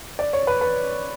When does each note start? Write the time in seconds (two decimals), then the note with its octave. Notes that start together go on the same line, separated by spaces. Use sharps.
0.19 D5
0.33 C#5
0.47 B4
0.61 B4